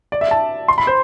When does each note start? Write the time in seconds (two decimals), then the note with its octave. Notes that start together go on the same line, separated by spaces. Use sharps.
0.12 D5
0.21 E5
0.31 A5
0.68 C6
0.78 B5
0.87 C5